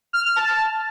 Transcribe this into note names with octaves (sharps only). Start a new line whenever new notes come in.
F6
F6
A5